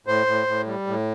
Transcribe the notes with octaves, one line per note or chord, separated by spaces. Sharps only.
A2 C5
A2
A2
G3
A2